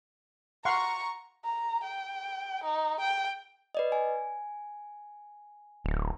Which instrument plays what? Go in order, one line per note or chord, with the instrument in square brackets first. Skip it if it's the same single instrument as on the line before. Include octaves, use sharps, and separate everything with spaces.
[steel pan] F5 F#5 C6 [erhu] A#5 [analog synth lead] C#6
[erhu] A#5
G5
D#4
G5
[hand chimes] B4 D5 D#5
G#5
[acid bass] D1